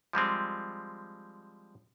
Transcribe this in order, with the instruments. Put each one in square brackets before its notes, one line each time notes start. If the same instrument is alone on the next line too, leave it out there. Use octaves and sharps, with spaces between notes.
[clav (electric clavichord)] F3 G3 G#3 C4